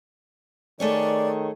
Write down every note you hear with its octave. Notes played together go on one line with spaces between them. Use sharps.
D#3 A3 G#4 C#5 D5